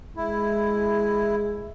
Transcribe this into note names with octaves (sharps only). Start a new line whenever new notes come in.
G#3 E4